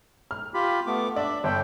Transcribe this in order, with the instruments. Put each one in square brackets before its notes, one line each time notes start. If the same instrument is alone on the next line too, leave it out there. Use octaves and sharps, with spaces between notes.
[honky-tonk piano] F6
[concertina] F4 G4 B5
A3 B3 D6
[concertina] D4 E5 [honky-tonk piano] D5
[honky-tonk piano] G1 [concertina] A4 G5